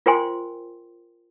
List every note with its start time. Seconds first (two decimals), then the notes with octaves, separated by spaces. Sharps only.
0.06 F4 A#4 C5 G5 G#5 C6